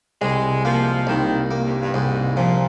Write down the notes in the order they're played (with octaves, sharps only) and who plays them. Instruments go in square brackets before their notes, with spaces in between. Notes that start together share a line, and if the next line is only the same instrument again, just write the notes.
[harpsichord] C2 [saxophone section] G#3
[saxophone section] F3 [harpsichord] A#3
[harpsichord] C2 [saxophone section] D#3
[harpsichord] A#3
[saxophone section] G2
G2
[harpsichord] C2 [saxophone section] G#2
[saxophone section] A#2 [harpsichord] F3